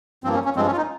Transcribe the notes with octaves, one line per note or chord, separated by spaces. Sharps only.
G2 F3 A#3 C4
C#4
C#4
G2 F3 G#3 C4
C#4
F4
D#4